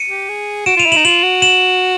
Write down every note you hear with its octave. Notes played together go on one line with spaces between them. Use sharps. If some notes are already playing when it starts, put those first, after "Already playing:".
Already playing: C#7 D#7
G4
G#4
F#4 D7 E7
F4 D#7 F7
E4
D#4 E7 F#7
F4 E7 F#7
F#4
E7 F#7